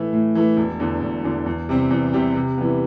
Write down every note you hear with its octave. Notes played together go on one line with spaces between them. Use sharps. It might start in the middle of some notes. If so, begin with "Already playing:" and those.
Already playing: A2 E3 A3
A2
E3 A3
E1
E2 D3
E1
E2 D3
E2
C3 G3 C4 G4
E2
C3 G3 C4 G4
C3
E3 G3 B3